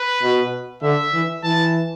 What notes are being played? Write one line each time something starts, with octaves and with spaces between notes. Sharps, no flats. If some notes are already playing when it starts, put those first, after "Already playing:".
Already playing: B4
B2
D3 E5
E3
E3 A5